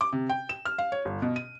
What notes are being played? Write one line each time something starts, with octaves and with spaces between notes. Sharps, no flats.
D6
C3
G5
E7
F6
F5
C#5
G1
B2
D#7